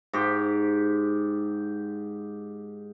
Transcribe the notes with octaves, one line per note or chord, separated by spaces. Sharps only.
G#2 G4